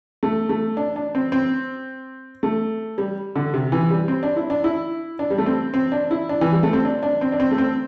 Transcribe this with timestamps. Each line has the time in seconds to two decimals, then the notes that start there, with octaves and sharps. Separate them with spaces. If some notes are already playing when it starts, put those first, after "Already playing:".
0.23 A3
0.49 A3
0.77 D4
0.96 D4
1.15 C4
1.32 C4
2.43 A3
2.98 G3
3.36 D3
3.54 C3
3.72 E3
3.91 G3
4.08 C4
4.23 D4
4.36 E4
4.50 D4
4.64 E4
5.19 D4
5.30 G3
5.38 A3
5.46 C4
5.74 C4
5.92 D4
6.11 E4
6.29 D4
6.41 E3
6.52 G3
6.63 A3
6.73 C4
6.85 D4
7.03 D4
7.21 C4
7.32 D4
7.40 C4
7.51 A3
7.58 C4